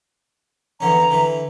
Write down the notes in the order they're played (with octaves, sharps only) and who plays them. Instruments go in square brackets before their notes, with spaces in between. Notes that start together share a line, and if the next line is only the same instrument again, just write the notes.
[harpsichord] E2 D3 C#4 [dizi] A#5
[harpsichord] D3 E3